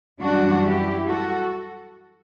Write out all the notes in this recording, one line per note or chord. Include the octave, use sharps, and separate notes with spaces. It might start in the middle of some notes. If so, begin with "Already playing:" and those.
F#2 E3 G3 D4 F#4
E4 G4
F#4 A4